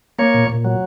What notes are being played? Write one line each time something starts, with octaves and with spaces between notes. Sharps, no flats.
A#3 C#5
A#2
A#2
F#3